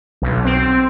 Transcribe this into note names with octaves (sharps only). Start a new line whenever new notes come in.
B1
C4